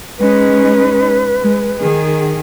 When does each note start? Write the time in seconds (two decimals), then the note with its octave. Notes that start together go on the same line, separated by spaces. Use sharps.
0.19 G#3 C#4 D#4 B4
1.41 G#3
1.80 D#3 G#4